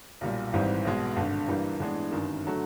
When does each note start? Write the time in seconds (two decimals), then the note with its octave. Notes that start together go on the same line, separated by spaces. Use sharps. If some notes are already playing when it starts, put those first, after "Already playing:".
0.21 B1 A#2 G3
0.53 G#1 G#2 E3 G3 C4
0.85 B1 B2 G#3
1.16 G#1 G2 D3
1.48 G2 E3 G3 A#3
1.80 A2 E3 G#3 B3 D4
2.12 G1 F#2 D#3
2.46 D3 F#3 A3